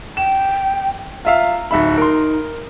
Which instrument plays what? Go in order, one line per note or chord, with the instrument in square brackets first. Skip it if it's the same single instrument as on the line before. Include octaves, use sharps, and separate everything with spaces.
[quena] G5 [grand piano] E7
[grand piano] F4 E5 F5 [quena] A#5
[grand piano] D1 E5 B5 [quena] D#4
[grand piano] A#4 C6